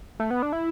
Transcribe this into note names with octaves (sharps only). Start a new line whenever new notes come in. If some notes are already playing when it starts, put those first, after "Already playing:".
A3
B3
D4
E4